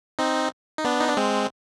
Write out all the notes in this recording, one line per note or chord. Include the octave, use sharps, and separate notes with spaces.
C4 D#4
D#4
B3 D4
D#4
D4
G#3 C4